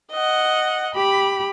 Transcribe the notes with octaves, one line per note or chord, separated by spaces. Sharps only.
D#5 F#5
G4 B5